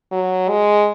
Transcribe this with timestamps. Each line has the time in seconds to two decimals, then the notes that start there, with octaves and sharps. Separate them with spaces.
0.12 F#3
0.49 G#3